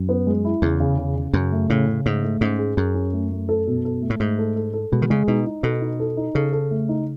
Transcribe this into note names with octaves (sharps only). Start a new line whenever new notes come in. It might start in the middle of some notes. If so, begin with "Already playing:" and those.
Already playing: F#2
B3
G#3
E4
E2 C#3
C#3
C#3
C#3
F#2 C#3
A3
A2 C#3
C#3
G#2 A3
A3
G#2 C#4
G#4
F#2 G#4
C#4
A3
A3
A4
B2
A4
A3
A2
G#2 A3
A4
A4
A4
B2 G#3
D#3
C#3 G#3
B2 D#4
D#4
B2 A4
D#4
A4
D#4
C#3 A4
A4
A3
D#4